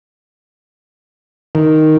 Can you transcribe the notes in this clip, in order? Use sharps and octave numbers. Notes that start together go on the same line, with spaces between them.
D#3